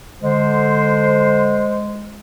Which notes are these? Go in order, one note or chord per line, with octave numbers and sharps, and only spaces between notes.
D3 G#3 C5